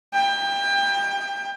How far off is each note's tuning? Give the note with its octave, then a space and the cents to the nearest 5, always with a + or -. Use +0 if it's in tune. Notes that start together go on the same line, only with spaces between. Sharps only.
G5 +25